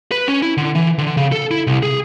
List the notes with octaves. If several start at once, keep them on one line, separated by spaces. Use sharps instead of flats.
B4
C#4
E4
D3
E3
D3
C#3
A4
E4
C2
G#4